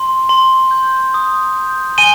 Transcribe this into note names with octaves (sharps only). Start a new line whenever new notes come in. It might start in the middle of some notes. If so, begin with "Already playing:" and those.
Already playing: C6
C6
G6
D#6
G6
G#5 D#7 G7